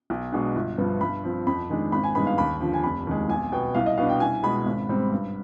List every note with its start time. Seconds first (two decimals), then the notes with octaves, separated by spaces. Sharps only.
0.10 B1
0.32 B2 G#3 D4
0.55 G1
0.78 G2 F3 B3
1.01 G2 B5
1.24 F3 C4
1.47 F2 B5
1.70 D#3 G#3 D4
1.92 G#1 B5
2.03 G#5
2.15 G2 D#3 G#3 B3 B5
2.27 F5
2.38 D#2 B5
2.61 D3 F3
2.74 G#5
2.84 F1 B5
3.07 D#2 D#3 G#3
3.29 B1 G#5
3.52 B2 B3 G5
3.74 C2 F5
3.86 D#5
3.97 B2 B3 D4 F5
4.09 G5
4.20 C2 G#5
4.43 B2 G#3 B5
4.66 G#1
4.89 G#2 G3 C4
5.12 G2